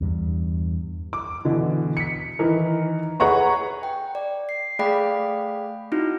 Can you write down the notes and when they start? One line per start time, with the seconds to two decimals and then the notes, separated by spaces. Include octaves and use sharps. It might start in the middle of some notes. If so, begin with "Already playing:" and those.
0.01 E2 G2
1.13 D6
1.45 B2 D3 E3
1.97 B6 C#7
2.39 D#3 E3 A#4
3.20 G#4 B4 C#5 F#5 A#5 C#6
3.83 G5
4.15 D5
4.49 C7
4.79 A3 G#4 D5 F5 G5 B5
5.92 C4 D#4 E4 F#4